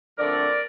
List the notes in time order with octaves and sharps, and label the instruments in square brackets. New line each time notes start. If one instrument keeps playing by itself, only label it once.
[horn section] D3 F3 A3 C4 A#4 D5